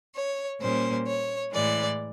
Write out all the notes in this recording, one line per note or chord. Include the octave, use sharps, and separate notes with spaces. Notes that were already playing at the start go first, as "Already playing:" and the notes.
C#5
A#2 G3 A#3 C#4 C5
C#5
A2 E3 G#3 D5